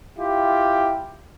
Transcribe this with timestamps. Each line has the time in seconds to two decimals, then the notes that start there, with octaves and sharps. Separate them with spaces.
0.19 E4 F4 G4